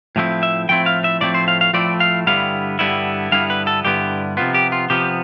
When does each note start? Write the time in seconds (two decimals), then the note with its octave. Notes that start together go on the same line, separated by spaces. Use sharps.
0.16 A2 F3 A3 C4 E4
0.43 E5
0.69 A2 F3 A3 C4 E4 G5
0.86 F5
1.04 E5
1.21 A2 F3 A3 C4 E4 D5
1.34 C5
1.48 F5
1.61 F5
1.73 A2 F3 A3 C4 E4 D5
2.00 F5
2.26 G2 D3 G3 B3 E4 F5
2.79 G2 D3 G3 B3 E4
3.32 G2 D3 G3 B3 E4 F5
3.50 B4
3.67 A4
3.85 G2 D3 G3 B3 E4 G4
4.37 C3 F3 B3 F4
4.54 G4
4.72 F4
4.90 C3 F3 B3 G4